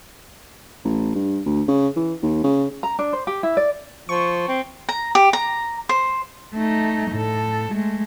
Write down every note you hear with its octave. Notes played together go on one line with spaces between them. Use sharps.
A1
G2
D2
C#3
E3
D#2
C#3
A#5
D4
C5
G4
E4
D5
F3 C#6
C4
A#5
G4
A#5
C5
A3 D#4
A2 A4
G#3 A3